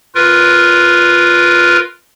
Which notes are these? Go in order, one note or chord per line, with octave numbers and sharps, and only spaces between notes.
F4 A#4 B4